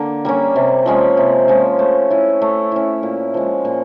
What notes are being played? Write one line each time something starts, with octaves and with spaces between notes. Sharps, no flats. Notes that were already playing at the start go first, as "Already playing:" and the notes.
Already playing: D3 A#3
G3 A#3 C#4
C3
F3 G#3 C#4
C3
F3 G#3 C#4
A3
C#4 E4
A3
C#4 E4
A#2
F3 G#3
A#2